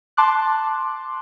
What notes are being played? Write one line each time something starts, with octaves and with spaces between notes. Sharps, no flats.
A5 C6 D6 F#6